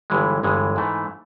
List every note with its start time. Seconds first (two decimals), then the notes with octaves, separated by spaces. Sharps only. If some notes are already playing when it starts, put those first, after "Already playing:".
0.10 G1 G2 E3 G#3
0.43 G1 G2 E3 G#3
0.76 G#2 E3 A3